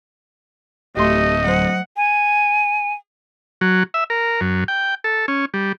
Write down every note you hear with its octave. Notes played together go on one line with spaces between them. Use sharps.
D1 A3 G4 D#5 C6
F#3 C5 F#5
G#5
F#3
E5
A#4
F#2
G5
A4
C#4
G3